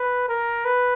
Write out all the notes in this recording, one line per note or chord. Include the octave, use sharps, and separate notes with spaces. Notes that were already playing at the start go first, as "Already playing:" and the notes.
Already playing: B4
A#4
B4